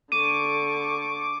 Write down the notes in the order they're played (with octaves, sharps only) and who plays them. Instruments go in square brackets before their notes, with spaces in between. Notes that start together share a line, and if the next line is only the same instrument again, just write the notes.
[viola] D3 C#6 [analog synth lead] D6 [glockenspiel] D#7